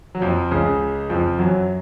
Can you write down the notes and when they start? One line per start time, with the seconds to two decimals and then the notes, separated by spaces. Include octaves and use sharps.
0.15 F#3
0.22 F2 F3
0.51 C#2 C#3
1.10 F2 F3
1.39 F#2 F#3